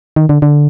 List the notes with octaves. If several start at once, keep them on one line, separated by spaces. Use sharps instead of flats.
D#3
D3
D3